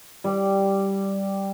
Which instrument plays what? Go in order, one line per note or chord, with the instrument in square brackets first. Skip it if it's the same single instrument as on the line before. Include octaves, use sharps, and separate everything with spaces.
[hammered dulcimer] G3